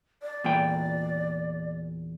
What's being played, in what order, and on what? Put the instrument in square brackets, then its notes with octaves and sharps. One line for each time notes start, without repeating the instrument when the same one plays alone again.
[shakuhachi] D5
[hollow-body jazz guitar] E2 A#2 G5